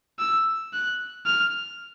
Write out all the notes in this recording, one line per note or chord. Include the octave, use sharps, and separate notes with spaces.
E6
F#6
F6